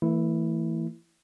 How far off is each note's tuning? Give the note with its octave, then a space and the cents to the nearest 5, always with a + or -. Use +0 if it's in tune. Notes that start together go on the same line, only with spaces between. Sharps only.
E3 +0 A3 +40 E4 +0